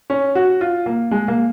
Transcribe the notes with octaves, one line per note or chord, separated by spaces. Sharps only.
C#4
F#4
F4
A#3
G#3
A#3